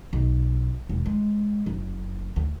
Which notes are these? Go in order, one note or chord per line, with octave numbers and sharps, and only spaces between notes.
B1
E1
G#3
F#1
D2